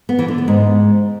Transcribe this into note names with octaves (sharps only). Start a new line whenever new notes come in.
B3
E3
D3
B3
G#2